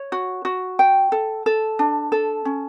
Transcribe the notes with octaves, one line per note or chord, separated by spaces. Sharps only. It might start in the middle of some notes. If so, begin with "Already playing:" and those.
Already playing: C#5
F#4
F#4
G5
A4
A4
D4
A4
C#4